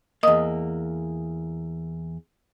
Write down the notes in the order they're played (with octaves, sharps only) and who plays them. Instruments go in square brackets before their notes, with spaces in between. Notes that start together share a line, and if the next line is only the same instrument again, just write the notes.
[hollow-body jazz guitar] E2 A#3 [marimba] D#5 D#6